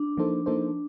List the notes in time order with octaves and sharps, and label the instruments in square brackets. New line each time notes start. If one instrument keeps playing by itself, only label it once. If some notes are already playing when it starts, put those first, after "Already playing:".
Already playing: [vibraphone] D4
[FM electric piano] F3 A#3 D#4 A4 C5
F3 A#3 D#4 A4 C5